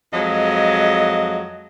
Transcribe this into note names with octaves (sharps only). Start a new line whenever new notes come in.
F2 F3 F#3 G#3 D#5